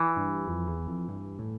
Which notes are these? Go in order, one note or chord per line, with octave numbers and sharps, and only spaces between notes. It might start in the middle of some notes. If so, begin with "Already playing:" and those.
Already playing: E3
G2
F2
E2
F2
G2
A2